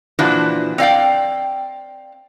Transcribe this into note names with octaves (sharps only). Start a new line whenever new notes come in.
A#2 E3 F3 D4 E4 F#4
C4 D5 F5 G5